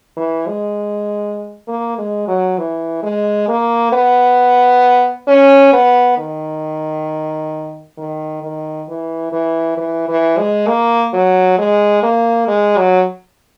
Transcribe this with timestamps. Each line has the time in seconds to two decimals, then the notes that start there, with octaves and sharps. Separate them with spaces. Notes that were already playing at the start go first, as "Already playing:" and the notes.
0.17 E3
0.47 G#3
1.68 A#3
1.98 G#3
2.28 F#3
2.58 E3
3.03 G#3
3.48 A#3
3.93 B3
5.28 C#4
5.73 B3
6.18 D#3
7.98 D#3
8.43 D#3
8.89 E3
9.32 E3
9.77 E3
10.08 E3
10.38 G#3
10.68 A#3
11.14 F#3
11.59 G#3
12.03 A#3
12.48 G#3
12.78 F#3